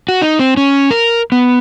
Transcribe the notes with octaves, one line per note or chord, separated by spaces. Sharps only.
F#4
D#4
C4
C#4
A#4
B3